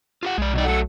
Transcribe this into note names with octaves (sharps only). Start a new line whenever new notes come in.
F4 G4 F#5
B1 G#3 D5
B2 E3 G3 D#4 D5
F#3 A3 A4 F#5